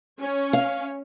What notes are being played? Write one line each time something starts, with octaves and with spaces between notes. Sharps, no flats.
C#4 C#5
F5